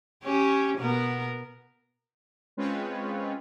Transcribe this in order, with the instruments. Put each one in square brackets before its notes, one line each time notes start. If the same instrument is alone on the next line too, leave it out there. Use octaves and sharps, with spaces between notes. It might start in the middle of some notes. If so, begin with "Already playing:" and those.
[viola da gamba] C#4 G4 C#5
B2 B3 A#4
[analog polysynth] G#3 C4 C#4 F4 B4 C#5